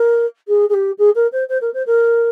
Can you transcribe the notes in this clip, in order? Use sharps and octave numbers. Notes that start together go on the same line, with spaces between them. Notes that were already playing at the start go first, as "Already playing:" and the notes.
Already playing: A#4
G#4
G#4
G4
G#4
A#4
C5
C5
A#4
C5
A#4